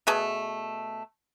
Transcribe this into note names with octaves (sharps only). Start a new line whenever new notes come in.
B2 A3 G#4 A5